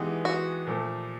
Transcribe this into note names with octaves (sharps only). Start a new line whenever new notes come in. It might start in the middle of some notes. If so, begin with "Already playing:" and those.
Already playing: E3 G#3 B3 D#4 G4
F#4
A#2 F3 A3